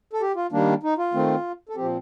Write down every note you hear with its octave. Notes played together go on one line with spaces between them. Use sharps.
A4
G4
F4
D#3 G3 A#3 D4
D#4
F4
D#3 A3 C4
A4
A#2 F3 C4 G4